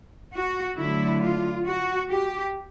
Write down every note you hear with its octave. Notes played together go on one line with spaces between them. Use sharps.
F#4
D3 F#3 A3 E4
F4
F#4
G4